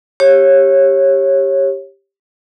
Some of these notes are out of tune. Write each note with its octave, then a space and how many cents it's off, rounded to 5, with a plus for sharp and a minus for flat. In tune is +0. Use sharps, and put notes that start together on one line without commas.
G4 +5 C#5 -20